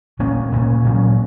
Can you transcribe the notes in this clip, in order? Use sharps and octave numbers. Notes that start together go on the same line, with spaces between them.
A#2 A#3 C#4
A#2 A#3 C#4
A#2 F#3 A#3 C#4